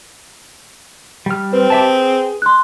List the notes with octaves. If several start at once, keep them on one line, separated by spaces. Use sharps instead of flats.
G3 F6
C4 B4
G4 E5 A5
G#4
C6 F#6